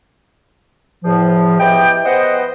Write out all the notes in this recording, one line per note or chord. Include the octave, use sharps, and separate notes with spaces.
E2 A2 F3
B3 E4 G4 G#4 D#5 G5
B3 C5 D#5 F#5